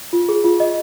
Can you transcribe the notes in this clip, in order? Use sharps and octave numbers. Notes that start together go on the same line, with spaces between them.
F4
G#4
F4
D#5